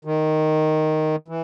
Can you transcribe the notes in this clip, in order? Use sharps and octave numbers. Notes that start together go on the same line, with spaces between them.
D#3
E3